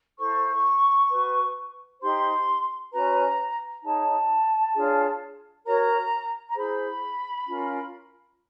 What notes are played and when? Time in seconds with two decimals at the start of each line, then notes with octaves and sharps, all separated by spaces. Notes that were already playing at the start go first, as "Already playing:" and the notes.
0.19 E4 A4 C5 C#6
1.10 F#4 B4
2.00 D#4 G4 C5 C6
2.92 C#4 F#4 B4 A#5
3.83 D#4 G#4 C#5 A5
4.74 D4 F4 G#4 C#5
5.65 F#4 A#4 C#5 A#5
6.48 A#5
6.55 E4 G#4 C5 B5
7.47 C#4 F4 A#4